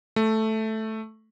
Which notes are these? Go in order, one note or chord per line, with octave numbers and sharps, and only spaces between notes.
A3